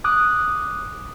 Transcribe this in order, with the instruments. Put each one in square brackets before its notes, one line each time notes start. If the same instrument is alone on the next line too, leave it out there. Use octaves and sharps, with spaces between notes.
[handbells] D6 D#6 F#6